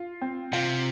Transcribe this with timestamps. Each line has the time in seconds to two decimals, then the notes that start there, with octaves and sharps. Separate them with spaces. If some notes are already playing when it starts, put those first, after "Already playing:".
Already playing: F4
0.21 C4
0.53 C3 F4